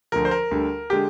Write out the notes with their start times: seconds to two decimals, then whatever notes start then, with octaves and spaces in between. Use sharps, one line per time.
0.12 D2 D3 F3 A#4
0.25 C5
0.31 A#4
0.51 D2 D3 G3
0.90 D3 G#3 G4